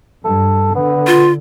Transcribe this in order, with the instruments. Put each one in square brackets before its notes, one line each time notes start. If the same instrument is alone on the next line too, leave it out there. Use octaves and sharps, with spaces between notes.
[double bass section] G2 [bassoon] A4
[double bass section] D3 [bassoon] B3
[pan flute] F4